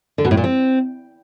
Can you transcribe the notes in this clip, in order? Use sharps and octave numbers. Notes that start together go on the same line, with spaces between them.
D3
B2
A2
A#2
C4